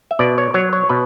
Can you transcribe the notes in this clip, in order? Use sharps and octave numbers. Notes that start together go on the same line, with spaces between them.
E5
B2 D5
C#5
F#3 C#5
C#5
B2 B4